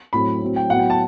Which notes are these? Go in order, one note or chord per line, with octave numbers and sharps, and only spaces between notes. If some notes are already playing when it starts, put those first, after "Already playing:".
A2 F#3 C4 B5
A2 F#3 C4
G5
A2 F#3 B3 F#5
G5
A5